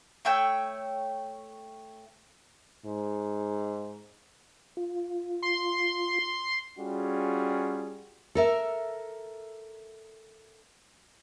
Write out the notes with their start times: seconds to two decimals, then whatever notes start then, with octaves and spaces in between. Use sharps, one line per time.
0.25 A3 C#5 G5 E6
2.85 G#2
4.77 F4
5.43 C6
6.78 G3 C#4 F4 F#4 G#4
8.35 A4 A#4 E5